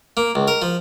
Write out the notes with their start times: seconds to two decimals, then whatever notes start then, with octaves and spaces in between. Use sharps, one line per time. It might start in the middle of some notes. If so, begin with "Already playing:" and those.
0.17 A#3
0.35 C#2
0.48 A#4
0.62 F3